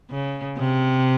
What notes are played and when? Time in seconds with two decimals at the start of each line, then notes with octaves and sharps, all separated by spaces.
0.11 C#3
0.58 C3